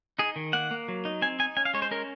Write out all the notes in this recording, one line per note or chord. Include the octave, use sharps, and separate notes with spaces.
D#4 G#4
D#3
A#3 F#5
A#3
F#3
D#4
C4 G#5
D#4 G#5
C#4 G#5
F5
G#3 C#5
C5
C#4 A#4